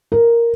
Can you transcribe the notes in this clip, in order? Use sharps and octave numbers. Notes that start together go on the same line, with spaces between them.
A#4